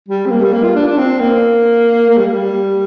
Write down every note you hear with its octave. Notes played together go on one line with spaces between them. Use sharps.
G3
C4
A#3
G3
A#3
F4
D4
D4
C4
A#3
A#3
G3
G3